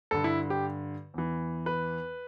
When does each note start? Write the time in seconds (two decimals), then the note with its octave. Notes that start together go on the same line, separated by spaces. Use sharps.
0.11 G2 D3 A4
0.24 E4
0.50 G4
1.14 E2 E3
1.66 B4